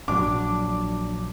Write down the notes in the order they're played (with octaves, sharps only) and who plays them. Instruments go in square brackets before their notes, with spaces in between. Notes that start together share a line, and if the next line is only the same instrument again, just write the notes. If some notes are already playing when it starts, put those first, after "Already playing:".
[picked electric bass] A#1 F#3 [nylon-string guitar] D4 [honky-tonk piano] D6